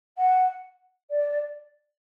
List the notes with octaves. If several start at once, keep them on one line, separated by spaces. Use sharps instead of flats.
F#5
D5